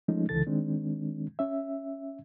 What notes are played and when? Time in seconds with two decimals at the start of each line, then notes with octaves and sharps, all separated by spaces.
0.08 F3 G#3 A3 C#4 D#4
0.29 C#2 D3 E3 A4 A6
0.47 D#3 G#3 C4 D4
1.39 C#4 E5